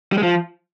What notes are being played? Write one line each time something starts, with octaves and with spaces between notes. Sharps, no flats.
G3
G#3
F3